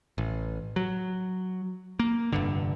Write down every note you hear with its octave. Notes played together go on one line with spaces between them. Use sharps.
A1
F#3
A#3
F1 G2 D3